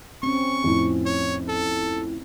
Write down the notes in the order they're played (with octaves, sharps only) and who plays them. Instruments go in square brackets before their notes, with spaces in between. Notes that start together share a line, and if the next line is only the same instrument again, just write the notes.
[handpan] C4 C#4 [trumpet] C#6
[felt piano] F2 A2
[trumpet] C#5
A4